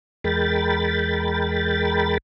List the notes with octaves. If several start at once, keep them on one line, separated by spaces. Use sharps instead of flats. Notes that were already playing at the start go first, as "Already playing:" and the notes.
E2 G#3 A#4 G5 B5 A6